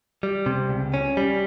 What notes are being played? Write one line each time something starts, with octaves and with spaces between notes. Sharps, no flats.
G3
C3
C#2
C#4
G3